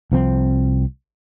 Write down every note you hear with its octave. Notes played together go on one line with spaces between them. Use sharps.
C2 F3 C4